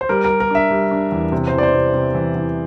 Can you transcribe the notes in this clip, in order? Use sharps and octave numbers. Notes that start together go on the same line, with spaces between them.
C5
G3 A#4
A#4
G3
A#4
D4 E5
G3
D4
E2
C3
C5
E3
D5
C5
C3
C3
E3
E3